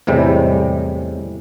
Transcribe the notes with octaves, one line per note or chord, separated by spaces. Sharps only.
E2 A2 C3 G3 G#3